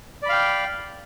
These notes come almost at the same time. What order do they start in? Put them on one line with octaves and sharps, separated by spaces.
D5 B5 F5 G5